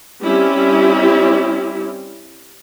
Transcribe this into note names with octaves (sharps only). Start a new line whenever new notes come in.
G3 C4 C#4 E4 G4